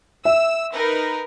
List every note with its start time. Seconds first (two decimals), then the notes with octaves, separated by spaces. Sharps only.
0.25 E5 E6
0.74 D#4 A#4 B4